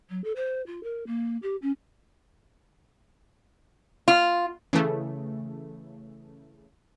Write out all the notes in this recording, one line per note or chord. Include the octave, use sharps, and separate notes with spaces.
F#3
A4
C5
F4
A#4
A#3
G4
C#4
F4
C#3 E3 A3